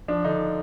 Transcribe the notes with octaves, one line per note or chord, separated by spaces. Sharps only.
F3 D4
D3 D#4